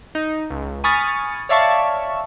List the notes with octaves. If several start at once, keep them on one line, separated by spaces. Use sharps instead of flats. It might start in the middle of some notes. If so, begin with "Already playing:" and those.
D#4
C#2
G#5 B5 C#6 D#6 F6 A6
C#5 D5 E5 F5 A5 C#6